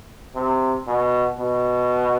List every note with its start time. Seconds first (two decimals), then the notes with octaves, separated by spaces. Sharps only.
0.35 C3
0.88 B2
1.40 B2